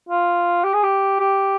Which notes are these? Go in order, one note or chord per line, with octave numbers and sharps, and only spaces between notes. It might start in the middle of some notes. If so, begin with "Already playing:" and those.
F4
G4
G#4
G4
G4